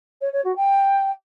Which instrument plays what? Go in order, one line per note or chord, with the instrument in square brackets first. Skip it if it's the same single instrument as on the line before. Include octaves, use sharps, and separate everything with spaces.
[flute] C#5
C#5
F#4
G5